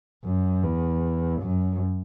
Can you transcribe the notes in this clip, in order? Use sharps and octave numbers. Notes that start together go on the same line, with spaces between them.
F#2
E2
F#2